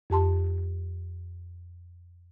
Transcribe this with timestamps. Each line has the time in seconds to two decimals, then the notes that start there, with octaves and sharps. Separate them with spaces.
0.10 F2 G4 A5 C6